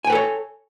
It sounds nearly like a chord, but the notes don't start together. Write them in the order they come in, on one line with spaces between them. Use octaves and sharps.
G#5 G5 B4 A4 C#5